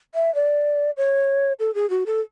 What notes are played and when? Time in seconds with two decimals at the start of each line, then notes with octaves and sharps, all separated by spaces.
0.15 E5
0.35 D5
0.97 C#5
1.59 A4
1.75 G#4
1.90 F#4
2.06 A4